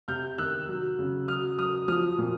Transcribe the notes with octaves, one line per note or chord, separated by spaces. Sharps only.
C3 F6 G6
D#3 E6 F#6
F#3
C#3
F#3 D#6 F6
F#3 D#6 F6
F3 D#6 F6
A#2